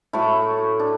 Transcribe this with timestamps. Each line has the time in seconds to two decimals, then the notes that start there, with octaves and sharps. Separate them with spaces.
0.13 A2 F#3 A3 E4
0.79 D4